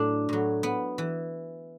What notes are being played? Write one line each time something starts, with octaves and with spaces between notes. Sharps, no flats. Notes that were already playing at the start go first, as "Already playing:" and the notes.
Already playing: A2 F#3 D4
A2 F#3
B3
E3